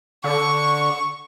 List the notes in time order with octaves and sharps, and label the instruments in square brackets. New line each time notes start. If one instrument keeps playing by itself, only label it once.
[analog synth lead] D3 [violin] C#6